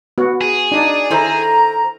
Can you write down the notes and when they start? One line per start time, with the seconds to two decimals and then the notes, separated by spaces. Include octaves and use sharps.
0.18 B3 F#4
0.41 G#4
0.72 D4 D#4 D5
1.11 D#3 E4 A4 C5 A#5